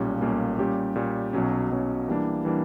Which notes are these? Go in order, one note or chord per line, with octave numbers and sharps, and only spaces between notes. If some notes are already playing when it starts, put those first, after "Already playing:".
Already playing: B1 A#2 G3 A#3 C#4
B1 A#2 G3 A#3 C#4
A#2 G3 C#4 G4
A#2 G3 C#4 G4
B1 B2 F#3 C#4
B1 B2 F#3 C#4
E3 G3 A#3 D4
E3 G3 A#3 D4